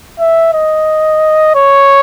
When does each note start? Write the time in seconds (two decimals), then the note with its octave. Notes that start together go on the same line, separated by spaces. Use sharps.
0.20 E5
0.54 D#5
1.55 C#5